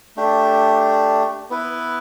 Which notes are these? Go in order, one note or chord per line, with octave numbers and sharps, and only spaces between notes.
A3 D4 G4
B3 E4 B4